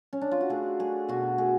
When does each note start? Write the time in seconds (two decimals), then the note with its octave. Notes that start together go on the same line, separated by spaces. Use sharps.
0.13 C#4
0.21 D4
0.31 F4
0.41 F#4
0.49 A3 G#4
0.79 A3 G#4
1.09 B2 F#4
1.38 A3 G#4